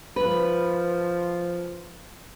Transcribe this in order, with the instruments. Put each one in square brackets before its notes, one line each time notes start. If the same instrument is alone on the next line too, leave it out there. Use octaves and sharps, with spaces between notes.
[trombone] F3 [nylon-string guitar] B4